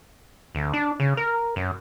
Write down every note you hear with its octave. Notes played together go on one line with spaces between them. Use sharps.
D2
D4
C#3
A#4
F#2